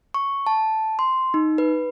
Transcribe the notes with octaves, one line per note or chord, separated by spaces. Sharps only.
C#6
A5
C6
D#4
B4